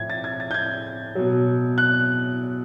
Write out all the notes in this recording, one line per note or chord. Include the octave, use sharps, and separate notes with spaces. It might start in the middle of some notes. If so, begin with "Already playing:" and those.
Already playing: A2 F3 G#6
A6
G#6
A6
G6
G#6
B2 F#3
F#6